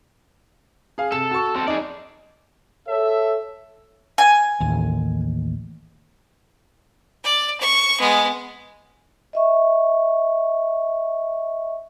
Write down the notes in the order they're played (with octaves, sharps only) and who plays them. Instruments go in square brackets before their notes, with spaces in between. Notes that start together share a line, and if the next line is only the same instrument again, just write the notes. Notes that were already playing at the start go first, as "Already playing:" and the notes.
[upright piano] G#4 F5
[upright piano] C3 E7 [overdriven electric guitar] A4
[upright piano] F#4 C#6
[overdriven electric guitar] C4 A4 [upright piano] A5
[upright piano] D#4 [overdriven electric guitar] G#4 D5
[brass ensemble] A4 C#5 E5
[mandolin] G#5
[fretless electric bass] A1 D#2
[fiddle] D5
C#6
G#3 B3
[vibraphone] D#5 E5 C#6